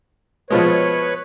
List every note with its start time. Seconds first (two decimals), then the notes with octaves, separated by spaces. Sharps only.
0.50 B2 F3 G#3 B4 C#5